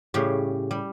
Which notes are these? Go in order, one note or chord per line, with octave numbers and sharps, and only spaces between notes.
A2 C#3 G3 G4
G3